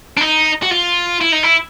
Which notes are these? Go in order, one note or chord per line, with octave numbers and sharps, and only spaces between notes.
D4
D#4
F#4
F4
E4
D#4
E4